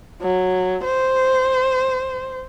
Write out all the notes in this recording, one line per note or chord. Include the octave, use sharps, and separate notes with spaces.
F#3
C5